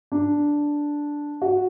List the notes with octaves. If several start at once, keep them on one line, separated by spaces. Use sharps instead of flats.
D4
F#4